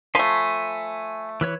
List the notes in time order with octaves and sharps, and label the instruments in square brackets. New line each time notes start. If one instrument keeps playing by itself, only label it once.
[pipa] F3 A3 [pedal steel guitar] G#5 B5 C6
[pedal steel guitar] E3 B4 C#5